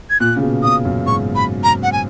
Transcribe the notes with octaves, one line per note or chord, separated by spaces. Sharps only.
G#6
A#2 F#6
C#3
B2
C#3 D#6
F#2
G#2 C#6
B5
A#5
F#5
G#5